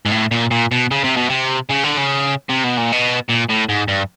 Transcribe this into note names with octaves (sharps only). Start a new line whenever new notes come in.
G#2
A2
A#2
A#2
B2
C#3
C3
B2
C3
C#3
D3
C#3
C3
B2
A#2
B2
A#2
A2
G#2
G2